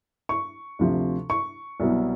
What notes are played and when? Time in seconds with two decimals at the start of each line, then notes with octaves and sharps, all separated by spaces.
0.29 C#6
0.79 D2 C3 F3
1.30 C#6
1.80 C2 B2 F#3 B3